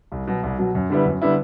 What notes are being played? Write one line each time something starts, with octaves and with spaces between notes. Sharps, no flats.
C2
B2 F#3
C2
B2 F#3
F#2
D3 G3 B3 E4
F#2
D3 G3 B3 E4